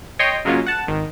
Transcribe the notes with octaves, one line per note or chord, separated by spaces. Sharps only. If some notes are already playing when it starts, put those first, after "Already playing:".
C#5 D#5 G5 C6
C#3 F#3 G#3 A#3 C#4 F4
F#5 A5
G#1 D#3